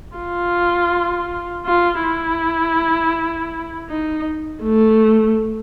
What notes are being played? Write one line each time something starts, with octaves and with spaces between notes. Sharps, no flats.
F4
F4
E4
D#4
A3